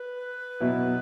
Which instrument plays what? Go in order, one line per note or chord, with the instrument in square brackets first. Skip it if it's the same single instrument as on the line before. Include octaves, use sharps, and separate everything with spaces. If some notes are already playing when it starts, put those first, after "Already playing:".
Already playing: [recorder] B4
[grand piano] B2 F#3 B3 E4